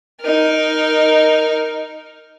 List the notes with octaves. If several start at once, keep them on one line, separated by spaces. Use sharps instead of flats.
D#4 A#4